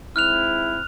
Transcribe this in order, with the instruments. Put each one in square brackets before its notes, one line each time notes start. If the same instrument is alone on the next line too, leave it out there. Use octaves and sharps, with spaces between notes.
[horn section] G#2 C4 E4 [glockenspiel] F6 F#6 F7